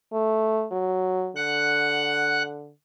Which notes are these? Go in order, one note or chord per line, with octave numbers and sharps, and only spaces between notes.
A3
F#3
D3 F#5 F#6